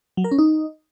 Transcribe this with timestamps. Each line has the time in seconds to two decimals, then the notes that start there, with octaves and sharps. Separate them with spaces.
0.17 F#3
0.24 A#4
0.31 C#4
0.38 D#4